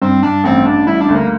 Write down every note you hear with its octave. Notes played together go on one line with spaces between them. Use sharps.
G2 C4
G2 D4
A1 C4
A1 D4
G3 E4
D4
D2
A#3